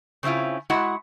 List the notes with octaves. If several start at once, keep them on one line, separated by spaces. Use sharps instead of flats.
C#3 C4 C#4 E4 F4
G#3 E4 F#4 F#5